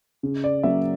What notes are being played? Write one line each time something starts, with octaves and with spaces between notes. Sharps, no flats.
C#3
D5
F#3 A#3 C#4 E5